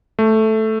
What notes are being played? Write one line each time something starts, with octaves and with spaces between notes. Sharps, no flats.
A3